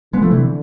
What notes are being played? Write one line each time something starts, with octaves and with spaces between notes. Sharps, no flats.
D3 G#3 B3
F3 A3
C3 E3